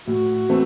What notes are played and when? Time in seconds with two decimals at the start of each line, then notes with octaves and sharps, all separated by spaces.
0.07 A2 F#4
0.49 E3 A3 C4